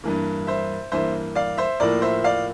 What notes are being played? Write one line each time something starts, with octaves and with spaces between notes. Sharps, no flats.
G2 E3 A#3
C5 E5
G2 E3 A#3 C5 E5
D5 F5
C5 E5
A2 F3 A#3 A#4 D5
C5 E5
D5 F5